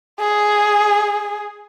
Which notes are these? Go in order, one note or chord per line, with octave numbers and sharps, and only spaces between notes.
G#4